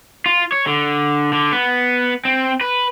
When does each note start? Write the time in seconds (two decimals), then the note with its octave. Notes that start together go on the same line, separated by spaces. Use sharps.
0.26 F4
0.52 C#5
0.66 D3
1.33 D3
1.52 B3
2.25 C4
2.61 B4